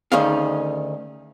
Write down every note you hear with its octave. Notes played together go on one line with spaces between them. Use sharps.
D2 D#3 C#4 D#4 G#4 F5